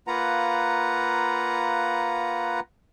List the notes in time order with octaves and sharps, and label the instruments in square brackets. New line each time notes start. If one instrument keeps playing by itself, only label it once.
[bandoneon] A#3 F4 B4 F#5 A#5